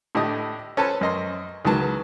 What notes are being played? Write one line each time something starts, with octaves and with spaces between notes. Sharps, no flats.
A2 D3 A3 G4 D#5 D#6
C#4 A4 B4 C5 A5
F#2 D#5 C6
C#2 D#3 E3 F#3 A5